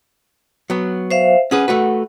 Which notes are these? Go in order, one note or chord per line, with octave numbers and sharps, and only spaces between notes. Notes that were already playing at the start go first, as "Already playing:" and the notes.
F#3 B3
C5 E5 F5
C#4 G#4 B4 F#5
A3 F#4 B4